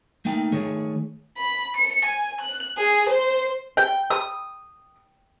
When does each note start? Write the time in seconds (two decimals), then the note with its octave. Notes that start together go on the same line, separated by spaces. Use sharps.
0.25 A3 A#3 D#4 G5
0.52 D#3 A3 G#4 C#5
1.38 B5
1.77 C#7
2.05 G#5
2.41 F#6
2.77 G#4
3.09 C5
3.77 G5
4.11 D#6